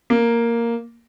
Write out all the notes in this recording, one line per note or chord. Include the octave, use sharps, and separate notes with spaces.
A#3